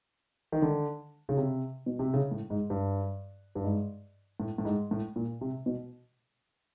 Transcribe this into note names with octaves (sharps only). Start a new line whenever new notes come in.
D#3
D3
C#3
C3
B2
C3
C#3
A2
G#2
G2
G2
G#2
A2
A2
G#2
A2
A#2
C3
B2